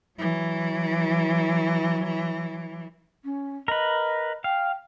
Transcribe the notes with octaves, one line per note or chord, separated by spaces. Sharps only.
E3 F#3
C#4
A#4 B4 D#5
F5 G5